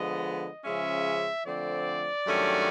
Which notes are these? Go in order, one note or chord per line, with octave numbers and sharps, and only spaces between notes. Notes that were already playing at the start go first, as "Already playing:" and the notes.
Already playing: D3 F3 G#3 B3 D#5
C#3 F3 G#3 C#4 E5
D3 F3 A3 C4 D5
G2 D#3 F#3 A3 C#4